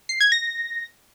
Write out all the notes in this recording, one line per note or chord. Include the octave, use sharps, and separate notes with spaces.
C7
G#6
A#6